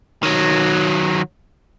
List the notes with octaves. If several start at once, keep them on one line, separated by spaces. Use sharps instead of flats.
D#3 F#3